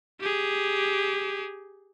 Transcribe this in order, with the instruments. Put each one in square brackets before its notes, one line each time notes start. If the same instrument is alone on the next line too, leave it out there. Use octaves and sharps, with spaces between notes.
[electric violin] G4 G#4